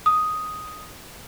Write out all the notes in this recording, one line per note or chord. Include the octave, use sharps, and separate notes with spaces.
D#6